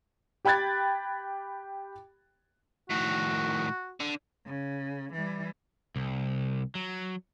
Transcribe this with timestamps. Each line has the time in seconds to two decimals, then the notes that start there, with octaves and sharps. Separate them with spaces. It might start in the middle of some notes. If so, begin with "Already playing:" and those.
0.45 G4 G5 B5 F#6 G#6 A6
2.90 A2 D#3 F#4
4.00 D3
4.46 C#3
5.13 E3 G3
5.96 C2
6.75 F#3